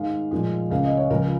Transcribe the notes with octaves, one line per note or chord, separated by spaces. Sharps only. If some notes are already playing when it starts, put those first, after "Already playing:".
Already playing: G#2 D#3 G#3 F5
A#2 F3 G#3
C#2 C#3 A#3 F5
D#5
C#5
C#2 C#3 F3 A#4